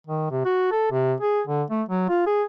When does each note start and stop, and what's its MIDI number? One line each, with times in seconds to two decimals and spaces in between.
0.07 0.30 51
0.31 0.40 48
0.45 0.69 66
0.71 0.91 69
0.91 1.14 48
1.20 1.41 68
1.47 1.63 50
1.70 1.83 57
1.89 2.08 54
2.09 2.24 65
2.27 2.43 68